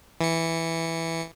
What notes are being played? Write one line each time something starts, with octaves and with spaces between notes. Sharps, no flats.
E3 C#7